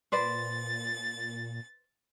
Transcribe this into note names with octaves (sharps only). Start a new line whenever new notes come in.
A#2 B4 C5 D5 A6